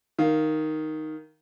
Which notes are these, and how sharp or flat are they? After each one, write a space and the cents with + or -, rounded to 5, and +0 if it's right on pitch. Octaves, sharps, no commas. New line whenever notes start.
D#3 +0 F5 +0